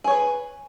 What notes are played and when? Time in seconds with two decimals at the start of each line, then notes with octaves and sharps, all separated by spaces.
0.04 G#4
0.07 C#5
0.11 B4